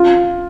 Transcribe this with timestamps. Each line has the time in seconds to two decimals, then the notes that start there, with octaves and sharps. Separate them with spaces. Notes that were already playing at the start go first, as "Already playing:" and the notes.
Already playing: F4